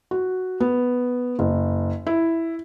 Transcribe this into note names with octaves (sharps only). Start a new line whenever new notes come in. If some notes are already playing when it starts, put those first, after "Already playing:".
F#4
B3
F#1
E4